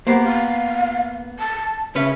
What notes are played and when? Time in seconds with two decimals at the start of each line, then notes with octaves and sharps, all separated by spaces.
0.07 A#3 B3 G4 C5
0.23 F5
1.39 A5
1.95 C#3 C#4 B4 E5